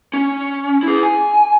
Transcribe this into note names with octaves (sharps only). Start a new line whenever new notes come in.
C#4
E4 G#4
G#5